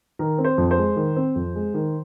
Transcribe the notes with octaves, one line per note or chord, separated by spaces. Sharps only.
D#3 A#4
C4
C5
F2
C5
G#3
D#3
C4
F2
G#3
D#3